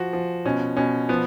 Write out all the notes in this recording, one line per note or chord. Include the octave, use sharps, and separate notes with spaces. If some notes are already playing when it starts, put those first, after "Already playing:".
Already playing: F3 F#4
F3
B2 C#4
B2 C#4
F3 B3